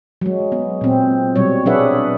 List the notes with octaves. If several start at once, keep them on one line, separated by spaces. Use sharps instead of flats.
F#3 G#3
B3
A#2 C4
B2 F#3 G3 C#5
F#3 D4 G#4 B4 E5 F#5